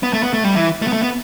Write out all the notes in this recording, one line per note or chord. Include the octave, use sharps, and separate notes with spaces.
B3
A3
B3
A3
G3
E3
A3
B3
A3
B3